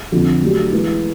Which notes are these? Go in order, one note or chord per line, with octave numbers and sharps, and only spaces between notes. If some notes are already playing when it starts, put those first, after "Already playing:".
F2 D3 F3
F#3 A3 D4 G4
E3 G#3 B3 E4